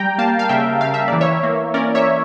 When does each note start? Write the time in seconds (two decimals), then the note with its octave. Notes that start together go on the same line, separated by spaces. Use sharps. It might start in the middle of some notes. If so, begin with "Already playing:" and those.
Already playing: G3 G5 A#5
0.18 A#3 F5 A5
0.39 F5
0.49 C#3 E5 G5
0.81 C#3 F5
0.94 E5
1.08 E3 D5
1.21 C#5 E5
1.43 A#3
1.74 C#4 A#4 D5
1.95 C#5 E5